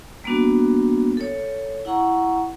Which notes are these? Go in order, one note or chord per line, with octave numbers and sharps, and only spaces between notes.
G3 A#3 B3 D4 F#4
A4 C#5
E4 F#5 A#5 C#6